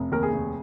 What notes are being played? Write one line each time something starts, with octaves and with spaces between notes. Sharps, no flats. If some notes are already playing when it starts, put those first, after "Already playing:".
Already playing: F1
D#2 A#4
G#4
F1